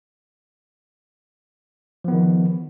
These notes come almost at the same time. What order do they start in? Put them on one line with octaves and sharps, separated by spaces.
F3 B3 D#3